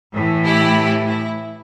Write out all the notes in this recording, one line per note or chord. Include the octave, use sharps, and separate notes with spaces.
A2 E3
E4 G4
E4